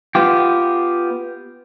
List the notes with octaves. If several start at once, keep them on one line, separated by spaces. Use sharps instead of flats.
B3 F4 G4